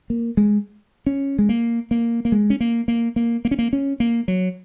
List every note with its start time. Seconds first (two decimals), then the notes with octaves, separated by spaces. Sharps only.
0.10 A#3
0.37 G#3
1.07 C#4
1.39 G#3
1.49 A#3
1.91 A#3
2.25 A#3
2.32 G#3
2.50 C#4
2.60 A#3
2.88 A#3
3.16 A#3
3.45 A#3
3.51 C#4
3.59 A#3
3.73 C#4
4.00 A#3
4.28 F#3